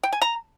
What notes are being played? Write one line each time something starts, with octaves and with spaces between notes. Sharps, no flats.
G5
G#5
A#5